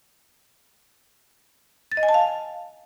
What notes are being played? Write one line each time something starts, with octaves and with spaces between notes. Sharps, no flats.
A6
D#5
G#5
A5
F5